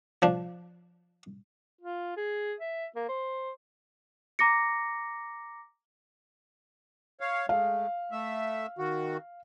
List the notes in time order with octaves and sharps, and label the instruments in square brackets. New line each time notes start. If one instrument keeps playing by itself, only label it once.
[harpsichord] F3 D4
[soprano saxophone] F4
G#4
E5
A#3
C5
[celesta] A#5 D6 A#6 C#7
[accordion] C#5 F5
[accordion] G#3 A3 [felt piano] F5
[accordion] A3 E5
D#3 F#4